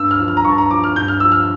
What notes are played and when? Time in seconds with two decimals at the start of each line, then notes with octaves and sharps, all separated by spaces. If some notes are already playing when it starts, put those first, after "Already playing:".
Already playing: G2 E6
0.11 F6
0.19 F3
0.28 F6
0.37 A#5
0.45 G2 C#6
0.51 A5
0.58 A#5
0.71 F3 D6
0.84 F6
0.96 G2 G6
1.08 F6
1.20 F3 E6
1.32 F6